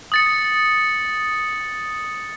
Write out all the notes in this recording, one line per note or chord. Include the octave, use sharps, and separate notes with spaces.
D#6 A6 C#7